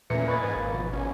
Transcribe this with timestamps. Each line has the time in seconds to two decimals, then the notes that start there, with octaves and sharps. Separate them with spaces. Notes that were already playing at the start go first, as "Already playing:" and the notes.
0.10 E2 A#2 E3 A3 C#4 A#5 C#7
0.28 B4 D#5 G#5 B5 C#6 A6
0.42 G#2 B4
0.56 G#1 A#3
0.72 B2 F3
0.93 G#1 B3 C#4 C#5 G#5